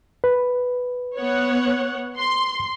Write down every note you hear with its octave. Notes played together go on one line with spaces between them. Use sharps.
B4
B3 C#5 F#5
C6